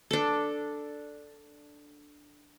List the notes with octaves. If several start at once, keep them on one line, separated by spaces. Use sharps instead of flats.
D4 A4